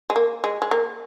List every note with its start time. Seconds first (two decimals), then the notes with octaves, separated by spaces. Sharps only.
0.10 G#3
0.16 A#3
0.44 G#3
0.62 G#3
0.71 A#3